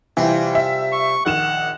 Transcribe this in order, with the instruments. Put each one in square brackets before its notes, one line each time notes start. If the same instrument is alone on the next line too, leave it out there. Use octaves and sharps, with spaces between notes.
[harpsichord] C3 G3 F4 [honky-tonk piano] E3
[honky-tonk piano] E5
[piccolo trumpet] C#6
[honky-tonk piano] A#1 D#3 E7 [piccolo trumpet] F#5